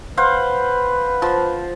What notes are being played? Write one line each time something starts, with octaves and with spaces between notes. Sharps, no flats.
B4 C5 F5 F#5
F3